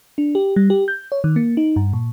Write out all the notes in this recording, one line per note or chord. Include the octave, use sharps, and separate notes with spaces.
D4
G4
G3
G4
G6
C#5
D#3
A#3
D#4
G2
A#2